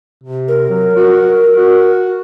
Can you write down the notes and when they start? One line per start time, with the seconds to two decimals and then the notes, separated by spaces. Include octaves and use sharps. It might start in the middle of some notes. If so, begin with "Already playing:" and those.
0.24 C3
0.48 A#4
0.70 F#3
0.96 F#4
1.56 F#4